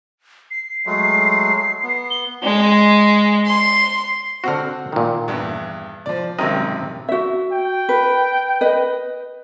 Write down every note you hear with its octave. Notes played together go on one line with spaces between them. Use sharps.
C7
F#3 G#3 A3
B3
G7
G#3
C6
D3 C4 F#4 F#5 F6
A#2 D#3
E2 G2
F3 D5
G#1 F#2 C3 D#3 D#5
F#4 E5
G5
B4
B4 D#5